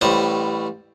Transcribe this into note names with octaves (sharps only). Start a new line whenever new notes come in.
A1 A2 G3 C5 D#5 A#5